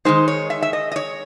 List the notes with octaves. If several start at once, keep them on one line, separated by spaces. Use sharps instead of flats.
D#3 G#3 D#4 C5
C#5
E5
E5
D#5
D#5
C#5